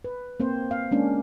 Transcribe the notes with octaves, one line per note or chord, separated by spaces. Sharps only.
B4
A#3 C4 C5
F5
G#3 A#3 C#4 D4